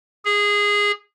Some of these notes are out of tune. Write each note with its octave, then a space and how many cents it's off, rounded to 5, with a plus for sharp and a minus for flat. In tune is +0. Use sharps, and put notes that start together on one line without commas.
G#4 -15